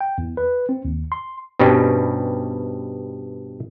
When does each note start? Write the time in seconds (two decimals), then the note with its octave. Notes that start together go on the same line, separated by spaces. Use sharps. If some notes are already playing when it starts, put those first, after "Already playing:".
0.01 G5
0.18 E2
0.37 B4
0.69 C4
0.85 D#2
1.12 C6
1.59 G2 B2 G3 C4 C#4 D#4